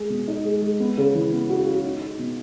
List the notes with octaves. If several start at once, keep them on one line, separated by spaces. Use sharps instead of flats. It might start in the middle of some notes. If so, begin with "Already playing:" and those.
Already playing: G#3 G#4
B2
D#4
G#3
G#3
B3
C#3
E3
B3
F#4
F#4
D#4
D#4
B2